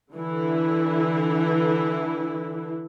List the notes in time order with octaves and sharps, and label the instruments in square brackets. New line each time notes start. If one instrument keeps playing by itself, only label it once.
[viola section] D3 E3 E4